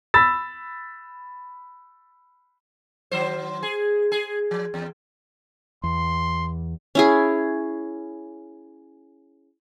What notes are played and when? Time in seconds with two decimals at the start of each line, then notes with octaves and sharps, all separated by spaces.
0.14 B5 E6 A6
3.11 D#3 F#3 C5
3.63 G#4
4.12 G#4
4.51 F3
4.74 E2
5.84 E2 C6
6.95 C#4 E4 G#4